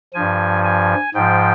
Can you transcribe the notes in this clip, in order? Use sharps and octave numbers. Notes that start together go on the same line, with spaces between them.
G2 F3 G#5
G#5
G#2 F3 G5